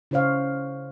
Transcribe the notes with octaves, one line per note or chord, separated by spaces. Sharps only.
C#3 E4 C5 C#5 F5